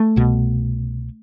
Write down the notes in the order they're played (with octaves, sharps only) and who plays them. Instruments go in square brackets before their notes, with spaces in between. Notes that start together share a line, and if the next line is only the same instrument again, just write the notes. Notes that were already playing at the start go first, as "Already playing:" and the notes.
Already playing: [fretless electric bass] A3
C2 B2